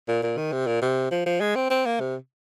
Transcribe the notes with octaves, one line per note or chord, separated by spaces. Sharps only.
A#2
A#2
D#3
C3
A#2
C3
F3
F3
G#3
C4
C4
A#3
C3